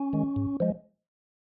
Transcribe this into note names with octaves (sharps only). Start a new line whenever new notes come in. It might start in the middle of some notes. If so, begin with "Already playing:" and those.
Already playing: C#4
D#3 G#3
G#2
F3 G#3